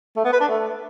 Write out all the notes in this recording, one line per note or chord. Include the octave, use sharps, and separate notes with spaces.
A3
B3
B4
D4
A3